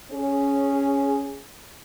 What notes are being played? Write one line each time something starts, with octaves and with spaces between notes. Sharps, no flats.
C#4 G#4